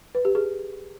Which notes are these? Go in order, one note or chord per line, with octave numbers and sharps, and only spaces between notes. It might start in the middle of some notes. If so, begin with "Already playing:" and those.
B4
G4
G#4